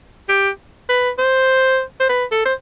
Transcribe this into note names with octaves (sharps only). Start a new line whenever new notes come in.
G4
B4
C5
C5
B4
A4
C5